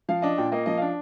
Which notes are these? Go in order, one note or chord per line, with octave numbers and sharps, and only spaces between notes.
F3 F5
D4 D#5
A#2 G5
A#3 D#5
F3 D#5
D4 F5